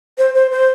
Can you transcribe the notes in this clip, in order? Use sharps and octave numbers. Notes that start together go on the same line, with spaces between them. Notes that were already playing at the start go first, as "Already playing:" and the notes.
C5
C5
C5